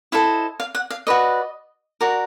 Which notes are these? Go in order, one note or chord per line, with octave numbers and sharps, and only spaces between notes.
E4 A4 C5 D#5 F5
F5
F#5
F5
F#4 B4 D5 D#5
F#4 A#4 D5